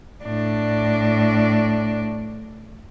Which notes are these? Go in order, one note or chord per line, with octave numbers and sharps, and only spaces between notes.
A2 D4